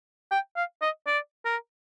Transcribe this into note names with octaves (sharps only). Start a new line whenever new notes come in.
G5
F5
D#5
D5
A#4